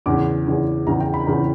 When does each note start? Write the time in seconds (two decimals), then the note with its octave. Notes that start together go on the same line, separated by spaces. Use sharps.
0.06 E2 C#3 E3 D6
0.47 E2 C#3 E3
0.87 E2 C#3 E3 A#5
1.00 G5
1.14 B5
1.26 E2 C#3 E3 A#5